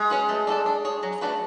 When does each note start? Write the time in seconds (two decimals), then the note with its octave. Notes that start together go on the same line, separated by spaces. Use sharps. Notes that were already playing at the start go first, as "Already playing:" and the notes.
Already playing: G#3
0.10 C#4 F#4 B4
0.29 A3
0.47 D4 F#4 A4 D5
0.66 D4
0.85 G#4 C#5
1.03 F#3
1.21 A3 D4 F#4 B4